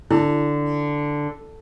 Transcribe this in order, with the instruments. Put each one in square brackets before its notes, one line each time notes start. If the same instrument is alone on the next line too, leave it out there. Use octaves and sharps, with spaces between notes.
[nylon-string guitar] D3 [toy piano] E4